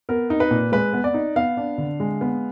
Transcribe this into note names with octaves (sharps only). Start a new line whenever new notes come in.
B3 A#4
D#4
B4
A#2
G#3 B4
B3
D5
D#4
B3 F5
D4
D3
G#3
B3